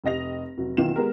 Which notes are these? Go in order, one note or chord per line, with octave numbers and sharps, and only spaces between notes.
F1 G4 D#5 A#6 F7
F1 F#3
B1 D#3 E3 F4 E7
G#3 B3 G4 A#4